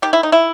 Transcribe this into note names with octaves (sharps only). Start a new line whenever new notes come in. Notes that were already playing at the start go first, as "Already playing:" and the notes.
D#3 G4
E4
D#4
E4